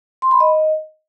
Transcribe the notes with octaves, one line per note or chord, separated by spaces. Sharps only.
C6
B5
D#5